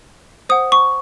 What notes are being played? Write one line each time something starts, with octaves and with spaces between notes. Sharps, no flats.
C5 F#5 D#6
C#6